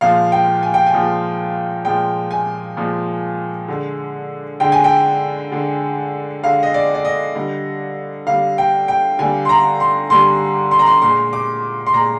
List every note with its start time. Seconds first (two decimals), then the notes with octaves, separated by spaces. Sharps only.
0.01 A#2 F3 G#3 F5
0.32 G5
0.63 G#5
0.74 G5
0.86 G#5
0.93 A#2 F3 G#3
1.85 A#2 F3 G#3 G5
2.31 G#5
2.77 A#2 F3 G#3
3.68 D3 G#3
4.60 D3 G#3 G5
4.72 G#5
4.84 G5
5.52 D3 G#3
6.44 D3 G#3 F5
6.63 D#5
6.74 D5
6.95 D5
7.05 D#5
7.35 D3 G3
8.27 D3 G3 F5
8.58 G5
8.88 G5
9.19 D3 G3 G#5
9.45 C6
9.49 A#5
9.80 C6
10.10 D3 G3 C6
10.71 C6
10.79 A#5
10.86 C6
11.02 A#2 G#3 C6
11.33 D6
11.86 C6
11.94 A#2 G#3 A#5